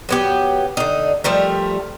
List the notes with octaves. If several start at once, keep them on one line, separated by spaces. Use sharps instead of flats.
F#3 B3 G4
D3 D#4
F3 G3 A3 A#4